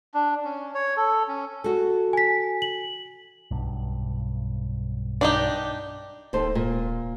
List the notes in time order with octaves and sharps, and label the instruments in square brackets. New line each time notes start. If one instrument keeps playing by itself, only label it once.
[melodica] D4
C#4
C#5
A4
C#4
[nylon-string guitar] F#4 A4
[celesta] G#5 B6
F#7
[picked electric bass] B1 G2
[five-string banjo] D4 D#4 G4
[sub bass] D1 [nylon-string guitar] D#2 A4 C5
[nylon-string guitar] A#2